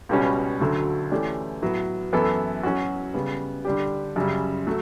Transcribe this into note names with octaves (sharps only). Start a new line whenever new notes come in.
C#2 B2 G3 C#4
D2 D3 F#3 A3
E3 A3 C#4 G4 D5
A2 F#3 B3
F#2 E3 B3 E4 A4
F#3 C#4 F#4
C#3 G3 B3
D3 G3 D4 G4
F#2 C#3 G3
F#3 A3